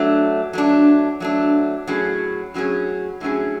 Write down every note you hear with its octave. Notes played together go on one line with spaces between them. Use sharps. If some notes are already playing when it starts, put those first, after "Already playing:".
Already playing: F#3 A3 D4
F#3 A3 D4
F#3 A3 D4
A2 F#3 C#4 G#4
A2 F#3 C#4 G#4
A2 F#3 C#4 G#4